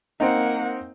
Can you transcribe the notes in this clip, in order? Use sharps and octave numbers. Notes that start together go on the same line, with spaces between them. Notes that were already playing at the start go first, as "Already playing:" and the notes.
A#3 C4 D#4 F#5